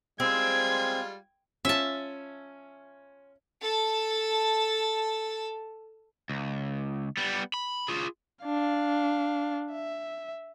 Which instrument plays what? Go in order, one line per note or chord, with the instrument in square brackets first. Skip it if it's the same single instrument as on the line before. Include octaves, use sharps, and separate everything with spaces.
[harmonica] G3 G#3 F4 [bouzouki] C4 [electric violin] G#6
[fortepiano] C#4 F4 [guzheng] E5 A5
[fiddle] A4 A5
[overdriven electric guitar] C#2
G3 B3
B5
F4 G#4
[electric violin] D4 F5
E5